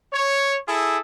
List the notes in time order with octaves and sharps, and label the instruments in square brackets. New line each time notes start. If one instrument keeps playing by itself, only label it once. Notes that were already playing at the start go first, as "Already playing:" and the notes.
[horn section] C#5
E4 G#4 A4